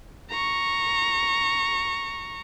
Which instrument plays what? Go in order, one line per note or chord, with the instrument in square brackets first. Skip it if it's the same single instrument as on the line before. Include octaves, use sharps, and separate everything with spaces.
[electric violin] A#5 C#6